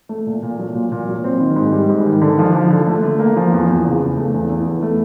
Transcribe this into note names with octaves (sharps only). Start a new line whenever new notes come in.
A3
A#2
A#2
F#3
A#2
A#2
F#3
C4
D#3
G#2
G3
G#2
D#3
D3
F3
F3
D3
A3
A3
A#3
F3
E2
E2
C#3
E2
A3
E2
E2
E3
A3